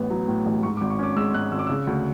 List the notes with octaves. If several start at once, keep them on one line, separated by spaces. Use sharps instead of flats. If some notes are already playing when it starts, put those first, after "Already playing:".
Already playing: A1 A2 B3
F#3
A2
A1
G#2 C#6
D6
G#1
C#6
C#4 D6
G#3 E6
G#2 F#6
G#1 E6
D6
C#3 E6
D2